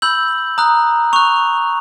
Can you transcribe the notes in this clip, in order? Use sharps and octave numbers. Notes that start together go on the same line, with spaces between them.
B5 E6 G6 F#7
A#5 D#6 F#6
C#6 F#6 F7